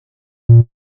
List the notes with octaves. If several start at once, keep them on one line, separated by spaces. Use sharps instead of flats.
A#2